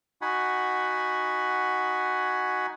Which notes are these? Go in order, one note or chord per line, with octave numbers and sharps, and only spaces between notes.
D#4 F#4 F#5 G#5 B5